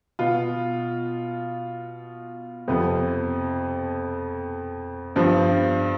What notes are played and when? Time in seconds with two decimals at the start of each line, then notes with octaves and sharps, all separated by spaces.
0.19 B2 B3 F4
2.68 F2 C3 F3 B3
5.16 G2 F3 B3